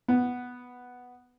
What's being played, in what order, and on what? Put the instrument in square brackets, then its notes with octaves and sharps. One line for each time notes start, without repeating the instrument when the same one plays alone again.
[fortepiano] B3